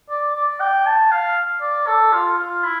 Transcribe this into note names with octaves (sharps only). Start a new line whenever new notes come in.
D5
D5
G5
A5
F5
D5
A4
F4
F4
E4